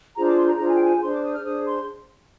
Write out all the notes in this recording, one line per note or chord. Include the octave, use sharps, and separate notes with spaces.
D4 F4 G#4 C5 A#5
D6
C6
A#5
D4 F4 G#4 C5 A#5
G#5
G5
G#5
D4 G#4 C5 C6
D6
D#6
F6
D4 G#4 C5 D#6
C6